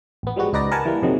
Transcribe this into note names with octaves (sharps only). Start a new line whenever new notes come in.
A1 B3
F3 G3 G#3 B3 F#4
C#2 D#4 B4 D5 A#6
A#4 B4 F#5 G#5 A5
E3 G3 A#3
F2 C3 D#3 F#3 G#3 A#3